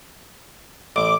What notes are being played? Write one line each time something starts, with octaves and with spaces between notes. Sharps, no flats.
A1 D6